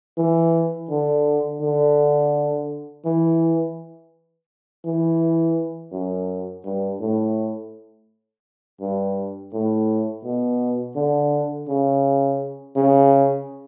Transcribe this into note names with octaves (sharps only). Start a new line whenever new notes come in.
E3
D3
D3
E3
E3
F#2
G2
A2
G2
A2
B2
D3
C#3
C#3